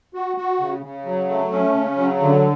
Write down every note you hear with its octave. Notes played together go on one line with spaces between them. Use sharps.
F#4
F#4
C#3
C#3
F#3
A3
C#4
C#3
F#3
D3